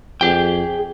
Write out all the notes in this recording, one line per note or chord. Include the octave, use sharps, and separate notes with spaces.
F2 G#4 G5